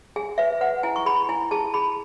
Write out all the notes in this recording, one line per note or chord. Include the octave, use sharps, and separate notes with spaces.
G#4 G#5
B4 E5
B4 F#5
E4 G#5
C#6
G#4 B5
E4 G#5
G#4 A5
G#4 B5